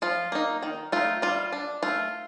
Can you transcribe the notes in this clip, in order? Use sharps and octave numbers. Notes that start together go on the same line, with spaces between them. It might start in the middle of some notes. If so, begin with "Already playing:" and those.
F3 F4
A#3 D#4
D#3
A3 D#4 F4
G3 F4
D4
A3 F4